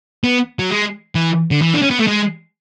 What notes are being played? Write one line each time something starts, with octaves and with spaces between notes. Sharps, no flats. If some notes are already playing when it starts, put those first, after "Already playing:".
B3
F#3
G#3
E3
D3
E3
D4
C#4
B3
A3
G#3